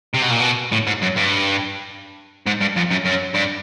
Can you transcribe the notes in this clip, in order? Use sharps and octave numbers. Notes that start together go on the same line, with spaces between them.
C3
B2
A#2
B2
A2
G#2
F#2
G2
G#2
G2
F2
F#2
F#2
G2